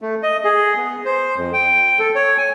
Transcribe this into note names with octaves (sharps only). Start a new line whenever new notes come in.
A3
D#5
G#4
B3
C5
F2
G5
A4
C#5
G#5